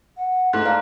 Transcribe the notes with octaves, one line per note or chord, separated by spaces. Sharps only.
F#5
G#2 A3 F#6
D5 F5 A5 A#5